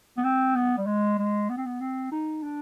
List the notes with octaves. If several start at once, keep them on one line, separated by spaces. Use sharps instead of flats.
B3
C4
B3
G3
G#3
G#3
B3
C4
B3
C4
D#4
D4